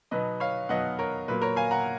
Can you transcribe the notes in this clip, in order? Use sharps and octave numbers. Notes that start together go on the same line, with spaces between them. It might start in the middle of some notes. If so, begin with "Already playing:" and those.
B2 F#3 B3 D#4 B4 D#5
C#5 F5
B2 F#3 B3 D#4 D#5 F#5
A#4 C#5
A#2 F#3 A#3 B4
A#4 C#5
F5 G#5
F#5 A#5